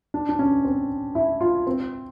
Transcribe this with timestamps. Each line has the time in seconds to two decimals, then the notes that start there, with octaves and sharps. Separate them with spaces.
0.14 D4
0.29 D4
0.39 C#4
0.65 C4
1.15 E4
1.41 F4
1.67 C4